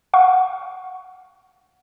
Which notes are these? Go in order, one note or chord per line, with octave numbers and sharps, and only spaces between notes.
F5 F#5 C#6